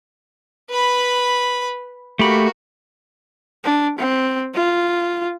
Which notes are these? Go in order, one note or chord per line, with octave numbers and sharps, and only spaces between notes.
B4 B5
A3 A#3 F#4 G4 B5
D4
C4
F4